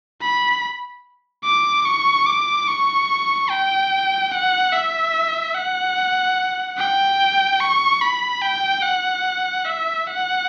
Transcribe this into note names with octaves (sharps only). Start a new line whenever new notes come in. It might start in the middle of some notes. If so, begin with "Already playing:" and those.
B5
D6
C#6
D6
C#6
G5
F#5
E5
F#5
G5
C#6
B5
G5
F#5
E5
F#5